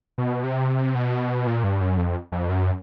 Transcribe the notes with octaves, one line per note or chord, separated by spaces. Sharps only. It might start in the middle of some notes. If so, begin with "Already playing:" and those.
B2
C3
B2
A#2
G2
F#2
F2
F2
F#2